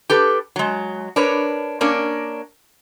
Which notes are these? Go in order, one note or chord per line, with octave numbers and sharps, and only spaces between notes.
G4 A4 B4
F#3 G#3
D4 A#4 B4 C#5
A#3 C#4 D4 A#4